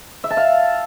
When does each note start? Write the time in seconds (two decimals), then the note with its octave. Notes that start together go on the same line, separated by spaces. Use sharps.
0.24 E5
0.30 A5
0.37 F5